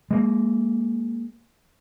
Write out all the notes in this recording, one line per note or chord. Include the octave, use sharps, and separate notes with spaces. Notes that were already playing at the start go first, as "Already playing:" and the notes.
G#3 A#3